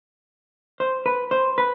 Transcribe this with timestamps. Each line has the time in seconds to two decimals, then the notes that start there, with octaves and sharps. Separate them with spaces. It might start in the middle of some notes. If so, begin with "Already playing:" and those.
0.80 C5
1.06 B4
1.31 C5
1.58 B4